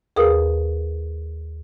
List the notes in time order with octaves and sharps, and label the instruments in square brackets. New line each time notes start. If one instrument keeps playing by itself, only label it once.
[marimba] D#2 G#4 A#4 B4 F5 D#6